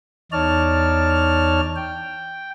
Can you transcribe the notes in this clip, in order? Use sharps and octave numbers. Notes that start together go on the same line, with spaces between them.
E2 D#4 C#5 D5 A5 F6
G5